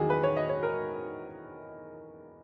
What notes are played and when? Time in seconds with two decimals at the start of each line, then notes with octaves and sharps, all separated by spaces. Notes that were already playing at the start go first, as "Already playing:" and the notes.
Already playing: E2 D#3 F#3 F#4 G#4
0.10 B4
0.23 C#5
0.37 D#5
0.49 C#5
0.63 A#4